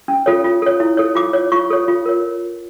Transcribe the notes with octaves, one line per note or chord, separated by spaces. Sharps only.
C#4
F4 A4 C#5
F4
A4 C#5
E4
A4 C#5
F4 D6
C#5
F4 C#6
A4 C#5
F4
A#4 C#5